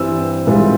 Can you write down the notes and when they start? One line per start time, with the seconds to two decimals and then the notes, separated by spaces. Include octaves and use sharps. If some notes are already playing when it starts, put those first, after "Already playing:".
Already playing: G2 E3 G3 C4 E6
0.47 G#2 E3 G3 C4 F4